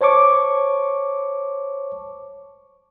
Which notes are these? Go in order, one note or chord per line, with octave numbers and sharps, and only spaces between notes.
C5 C#5 A5 C#6 D6